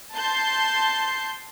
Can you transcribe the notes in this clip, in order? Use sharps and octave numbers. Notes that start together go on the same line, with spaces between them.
A5 C6 G6